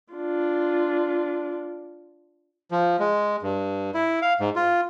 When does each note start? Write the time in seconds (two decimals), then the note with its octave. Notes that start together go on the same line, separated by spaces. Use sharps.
0.13 D4 F4
2.71 F3
2.99 G#3
3.42 G2
3.94 E4
4.22 F5
4.40 G#2
4.56 F4